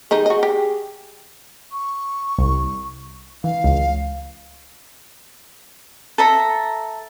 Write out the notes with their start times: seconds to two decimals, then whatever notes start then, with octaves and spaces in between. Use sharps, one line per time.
0.11 D#3 G3 D#4 G#4
0.26 F#4 D#5
0.43 G4
1.72 C#6
2.39 C2
3.44 E3 F5
3.64 C#2
6.18 A4 E5 A#5